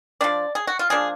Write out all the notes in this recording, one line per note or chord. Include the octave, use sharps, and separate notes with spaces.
F3 B3 D4 D5
G#4
F#4
F4
F3 A#3 D4 G#4